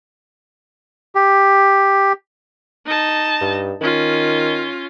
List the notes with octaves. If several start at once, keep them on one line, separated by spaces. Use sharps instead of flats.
G4
D#4 A5
G2
D#3 C#4 F4